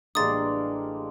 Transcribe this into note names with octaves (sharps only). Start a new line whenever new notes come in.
A1 G3 G#3 A#3 D4 D#6 A6